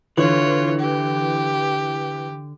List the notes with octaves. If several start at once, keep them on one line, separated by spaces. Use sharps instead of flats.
D3 E3 F4 C#5
G4